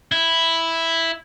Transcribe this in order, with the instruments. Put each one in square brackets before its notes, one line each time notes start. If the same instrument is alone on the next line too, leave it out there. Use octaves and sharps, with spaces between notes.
[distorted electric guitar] E4